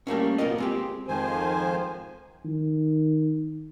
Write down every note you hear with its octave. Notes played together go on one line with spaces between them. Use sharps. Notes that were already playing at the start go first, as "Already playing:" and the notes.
G3 A3 A#3 C#4
A#3 B3 F4 A#4 D#5
G#3 C4 G4
F2 G#2 D#3 F3 C5 G#5
D#3